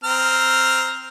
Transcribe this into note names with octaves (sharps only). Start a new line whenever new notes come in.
C4 A#5 F6